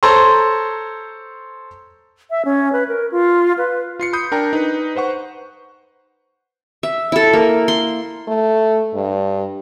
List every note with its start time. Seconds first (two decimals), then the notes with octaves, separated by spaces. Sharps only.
0.03 A4 C5 C#5 A#5 C6
2.31 E5
2.45 C#4
2.73 B4
2.88 A#4
3.12 F4
3.58 B4
3.99 F4 C7 C#7
4.13 B5 D#6 G6
4.32 D4 A#4 G5 A#5
4.53 D#4 B4
4.95 B4 C5 F#5 C#6
6.83 E5
7.12 E4 A4
7.33 A#3
7.68 C6
8.28 A3
8.94 G2